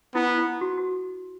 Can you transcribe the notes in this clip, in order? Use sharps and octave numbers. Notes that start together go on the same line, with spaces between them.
B3 E4
E4
F#4
F#4